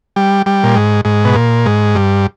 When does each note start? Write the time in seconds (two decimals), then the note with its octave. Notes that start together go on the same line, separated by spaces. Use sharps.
0.16 G3
0.46 G3
0.63 A#2
0.75 G#2
1.05 G#2
1.25 B2
1.35 A#2
1.66 G#2
1.95 G2